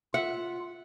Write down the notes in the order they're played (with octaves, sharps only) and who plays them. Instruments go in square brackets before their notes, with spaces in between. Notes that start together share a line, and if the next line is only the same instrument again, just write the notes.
[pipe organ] F4 [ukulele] E5 [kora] F#5